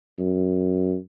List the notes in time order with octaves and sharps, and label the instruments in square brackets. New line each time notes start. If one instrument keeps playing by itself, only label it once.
[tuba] F#2